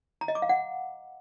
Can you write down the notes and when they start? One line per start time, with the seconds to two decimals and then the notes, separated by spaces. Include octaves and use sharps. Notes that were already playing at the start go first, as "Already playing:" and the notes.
0.21 A#5
0.28 D#5
0.35 D6
0.42 F5
0.49 F#5